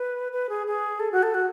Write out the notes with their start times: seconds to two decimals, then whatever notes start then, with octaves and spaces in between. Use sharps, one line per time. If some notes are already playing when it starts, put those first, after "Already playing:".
Already playing: B4
0.32 B4
0.49 G#4
0.67 G#4
1.00 A4
1.12 F#4
1.23 A4
1.34 F#4